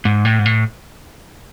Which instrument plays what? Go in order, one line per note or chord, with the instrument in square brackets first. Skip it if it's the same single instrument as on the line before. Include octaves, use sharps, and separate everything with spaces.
[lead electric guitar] G#2
A2
G#2
A2